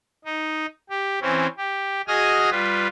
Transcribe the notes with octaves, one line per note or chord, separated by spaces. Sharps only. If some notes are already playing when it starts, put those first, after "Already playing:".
D#4
G4
E3 C4 C#4
G4
F#4 G#4 D#5 G#5 D#6 F6
G3 F4 B4